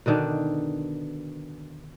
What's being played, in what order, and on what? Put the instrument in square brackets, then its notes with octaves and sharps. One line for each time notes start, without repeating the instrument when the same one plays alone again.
[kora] B2 D3 D#3 D4